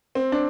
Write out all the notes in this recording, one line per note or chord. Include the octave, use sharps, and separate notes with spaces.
C4
D4